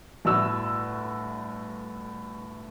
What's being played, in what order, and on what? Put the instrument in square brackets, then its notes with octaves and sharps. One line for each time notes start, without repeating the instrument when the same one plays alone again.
[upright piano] G1 A2 E4 F#4 E6